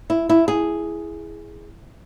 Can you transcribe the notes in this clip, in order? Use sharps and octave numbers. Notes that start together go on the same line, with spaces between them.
E4
E4
G#4